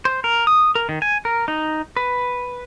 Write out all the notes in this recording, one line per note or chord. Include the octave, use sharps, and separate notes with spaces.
C5
A#4
D#6
A#4
D#3
G#5
A#4
D#4
B4